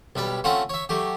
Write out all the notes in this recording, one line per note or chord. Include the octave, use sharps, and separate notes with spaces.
B1 G3 B4
A3 C4 C#4 F4 F#5
C#5 E5
F#3 A3 G4